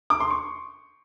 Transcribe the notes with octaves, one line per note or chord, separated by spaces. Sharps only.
D6
C6
C#6